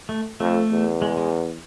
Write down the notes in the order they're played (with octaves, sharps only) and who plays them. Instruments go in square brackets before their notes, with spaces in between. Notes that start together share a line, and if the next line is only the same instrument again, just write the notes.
[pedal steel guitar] A3
[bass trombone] F2 [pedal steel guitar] A3
[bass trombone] E2
[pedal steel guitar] G#3
G#3